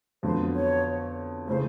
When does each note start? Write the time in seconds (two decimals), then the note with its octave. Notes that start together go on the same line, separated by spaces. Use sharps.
0.23 F2 D3 F#3 B3 C5
0.54 C#5
1.47 C#3 E3 A3 C5